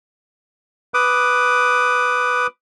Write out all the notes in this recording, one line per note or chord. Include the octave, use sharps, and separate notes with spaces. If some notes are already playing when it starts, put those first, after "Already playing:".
B4 D6 D#6